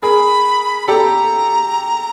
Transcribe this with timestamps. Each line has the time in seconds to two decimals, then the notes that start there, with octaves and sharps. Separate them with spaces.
0.02 G#4 A#4 B5
0.88 G4 A4 A#5